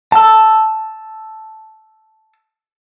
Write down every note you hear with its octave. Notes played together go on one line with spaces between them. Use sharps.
A5 E6